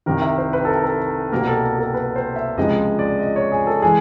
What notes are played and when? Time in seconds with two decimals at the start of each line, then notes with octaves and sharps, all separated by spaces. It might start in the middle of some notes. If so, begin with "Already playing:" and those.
0.06 C2 C3 D#3 A#4
0.22 E5
0.38 C5
0.53 B4
0.65 A4
0.69 A#4
0.84 A4
1.32 C2 B2 G3 A#3 A#4
1.47 A4
1.64 A#4
1.78 A4
1.94 B4
2.16 C5
2.36 E5
2.57 C#2 C3 F3 G#3 D#5
2.99 D5
3.20 D#5
3.36 C#5
3.52 G#4
3.67 A4
3.82 E3 G#3 G#4